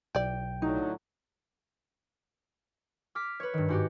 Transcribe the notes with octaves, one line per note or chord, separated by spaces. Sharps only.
B1 E4 D5 G5
A2 D3 F#3 D#4
D6 F6 B6
B4 C#5
G2 D#3
G#2 F#4 G4